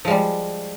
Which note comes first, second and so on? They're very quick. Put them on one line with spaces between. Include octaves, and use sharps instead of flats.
F3 G#3 G3